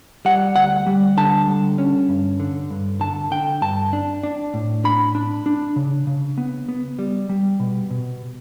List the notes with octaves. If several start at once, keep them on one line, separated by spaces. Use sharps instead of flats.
G3 F#5
D2 F#5
G3
D3 A5
G3
C#4
G2
D3
G2
D3 A5
D3 G5
G2 A5
D4
D4
A2
D4 B5
D4
D4
C#3
C#3
B3
B3
G3
G3
B2
B2